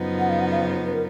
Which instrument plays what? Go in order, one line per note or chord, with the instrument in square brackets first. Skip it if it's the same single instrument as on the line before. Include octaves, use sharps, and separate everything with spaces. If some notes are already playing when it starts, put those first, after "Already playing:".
Already playing: [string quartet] F#2 C#3 F3 B3 D#4
[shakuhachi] F#5
F5
F#5
F5
B4
A#4